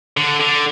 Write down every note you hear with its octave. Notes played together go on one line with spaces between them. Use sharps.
D3
D3